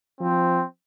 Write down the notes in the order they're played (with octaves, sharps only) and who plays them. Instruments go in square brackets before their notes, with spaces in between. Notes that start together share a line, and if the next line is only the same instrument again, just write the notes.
[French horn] F3 [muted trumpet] C4